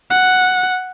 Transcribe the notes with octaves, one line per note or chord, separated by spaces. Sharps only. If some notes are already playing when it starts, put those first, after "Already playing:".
F#5